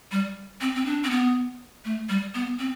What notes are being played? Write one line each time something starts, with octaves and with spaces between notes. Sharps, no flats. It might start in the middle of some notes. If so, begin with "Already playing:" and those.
G3
C4
C4
D4
C4
B3
A3
G3
B3
C4